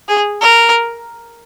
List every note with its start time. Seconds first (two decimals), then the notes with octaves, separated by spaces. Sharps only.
0.08 G#4
0.42 A#4